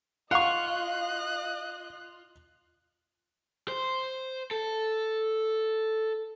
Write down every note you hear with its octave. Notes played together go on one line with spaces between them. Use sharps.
F4 D#5 F5 F#5 C#6 F#6
C5
A4